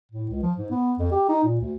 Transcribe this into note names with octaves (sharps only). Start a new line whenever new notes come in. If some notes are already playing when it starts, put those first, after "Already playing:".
A2
C#2
F3
G#2
B3
F2
G4
D#4
A#2
D2